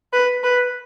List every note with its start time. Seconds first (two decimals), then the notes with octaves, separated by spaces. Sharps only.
0.13 B4
0.43 B4